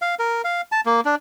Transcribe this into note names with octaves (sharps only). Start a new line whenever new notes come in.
F5
A#4
F5
A5
A#3
D4